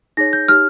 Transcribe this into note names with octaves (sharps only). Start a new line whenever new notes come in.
D#4 G#4 C#5 A#6
G6
D#4 G4 C#5 F6